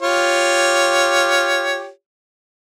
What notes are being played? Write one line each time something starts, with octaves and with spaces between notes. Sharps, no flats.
F4 G4 C#5